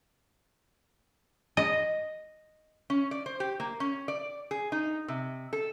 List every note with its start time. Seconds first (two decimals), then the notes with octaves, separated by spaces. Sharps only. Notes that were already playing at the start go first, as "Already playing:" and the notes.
1.57 D#5
2.90 C#4
3.11 D5
3.26 C5
3.40 G4
3.60 A#3
3.80 C#4
4.08 D5
4.51 G#4
4.72 D#4
5.08 C3
5.53 A4